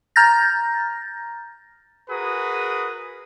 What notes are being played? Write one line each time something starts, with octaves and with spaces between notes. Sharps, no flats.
A#5 F6 G6 A6 A#6
F#4 G#4 A#4 B4 D#6